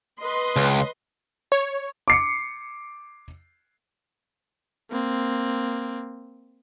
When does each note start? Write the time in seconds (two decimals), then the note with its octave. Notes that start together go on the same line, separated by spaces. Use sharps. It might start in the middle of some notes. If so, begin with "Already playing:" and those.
0.20 B4 D#5 C6
0.56 C#2
1.52 C#5
2.08 D6 C7 C#7
4.91 A#3 C4